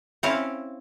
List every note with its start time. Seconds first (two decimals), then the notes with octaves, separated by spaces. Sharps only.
0.23 C4 C#4 E4 F5